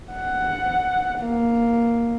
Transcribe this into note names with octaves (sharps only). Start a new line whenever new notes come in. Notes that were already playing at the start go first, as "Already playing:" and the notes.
F#5
A#3